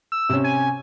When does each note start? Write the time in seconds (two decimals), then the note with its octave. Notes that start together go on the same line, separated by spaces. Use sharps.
0.12 E6
0.29 C3 C#4
0.44 G#5